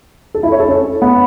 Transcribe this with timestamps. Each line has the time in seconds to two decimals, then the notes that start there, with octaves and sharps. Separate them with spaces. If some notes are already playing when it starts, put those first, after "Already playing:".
0.35 A4
0.43 E4
0.52 C#5
0.60 A4
0.68 C#4
1.02 B3